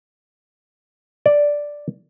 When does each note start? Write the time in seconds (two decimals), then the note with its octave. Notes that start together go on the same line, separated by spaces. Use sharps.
1.26 D5